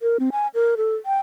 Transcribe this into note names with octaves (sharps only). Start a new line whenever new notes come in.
A#4
C4
G#5
A#4
A4
G5